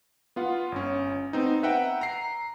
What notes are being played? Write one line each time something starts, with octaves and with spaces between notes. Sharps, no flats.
B3 F4 F#5
G1 C#4
B3 C4 D#4
B4 E5 F#5 G5 A#5
A#5 C7